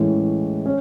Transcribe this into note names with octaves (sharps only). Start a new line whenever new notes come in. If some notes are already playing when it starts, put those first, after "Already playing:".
Already playing: A2 E3 G#3 C#4 G#4
C#4